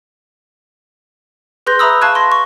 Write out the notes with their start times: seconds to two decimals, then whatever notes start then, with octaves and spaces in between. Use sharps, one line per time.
1.67 G#4 B4 C6 G6 A#6 G7
1.79 B4 E5 A#5 B5 D#6 E6
2.01 F5 A5 C#6 F#6 G#6 D#7
2.15 C6 A#6
2.32 C#6